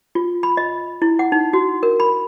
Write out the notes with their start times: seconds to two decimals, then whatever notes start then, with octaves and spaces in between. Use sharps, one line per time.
0.15 F4
0.43 B5
0.57 D#5
1.02 E4
1.19 F#5
1.32 D#4
1.53 F#4
1.83 A#4
2.00 B5